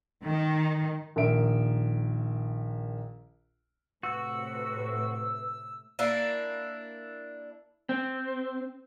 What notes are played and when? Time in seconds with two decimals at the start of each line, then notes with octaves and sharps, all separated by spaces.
0.25 D#3
1.16 A#1 D#3 A#4 E5 D7
4.03 A2 C3 F#4 B4 E6
5.99 A#3 D4 E4
7.89 C4